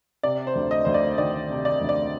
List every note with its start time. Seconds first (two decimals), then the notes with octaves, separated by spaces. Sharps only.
0.23 C3 D5
0.47 C5
0.55 D2
0.71 D#5
0.85 D2 C5
0.94 D5
1.18 D#3 D5
1.50 C3
1.65 D5
1.81 D2
1.89 D5